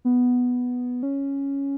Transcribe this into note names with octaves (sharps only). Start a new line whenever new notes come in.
B3
C#4